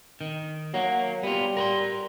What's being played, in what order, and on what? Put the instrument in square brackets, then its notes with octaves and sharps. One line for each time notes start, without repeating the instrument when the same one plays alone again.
[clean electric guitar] D#3
[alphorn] F#3 [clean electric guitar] A#3
[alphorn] G3 [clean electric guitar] B3 F4
[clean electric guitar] A#4 B5 C6